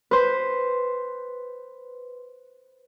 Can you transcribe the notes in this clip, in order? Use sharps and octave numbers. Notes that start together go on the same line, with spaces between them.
B4 C5